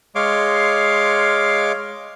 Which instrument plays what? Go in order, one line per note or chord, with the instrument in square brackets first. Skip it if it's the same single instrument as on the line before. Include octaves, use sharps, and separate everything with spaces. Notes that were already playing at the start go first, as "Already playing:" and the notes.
[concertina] G#3 C#5 F5 C6 D6